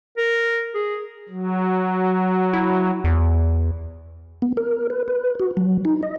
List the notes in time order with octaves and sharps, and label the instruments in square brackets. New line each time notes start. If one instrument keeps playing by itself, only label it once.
[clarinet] A#4
G#4
[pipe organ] F#3
[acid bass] E4
E2
[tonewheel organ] B3
A#4
B4
B4
F#4
F#3
D#4
D#5